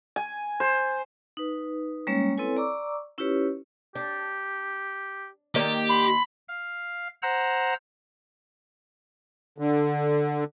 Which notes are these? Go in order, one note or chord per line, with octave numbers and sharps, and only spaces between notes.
G#5
C5
D#4 B4
G3 G#3 A#3 C#4 C#5
C4 E4 A4 B4 C#5 G#5
D5 A#5 C#6 D6 E6
C#4 E4 F4 G4 B4 C#5
D4 G4
D#3 A#3 G4 D5
B5 C6
F5
C5 F#5 A#5 E6
D3